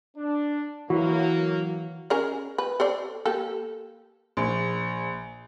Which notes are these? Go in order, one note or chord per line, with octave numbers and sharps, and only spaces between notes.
D4
E3 F#3 A#3 F#4
C#4 G#4 A#4
B4
A4 C5 D5
A#3 G4 A4
A#1